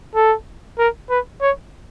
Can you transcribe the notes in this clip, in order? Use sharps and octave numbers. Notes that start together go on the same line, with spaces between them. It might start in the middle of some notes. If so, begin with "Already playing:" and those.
A4
A#4
B4
C#5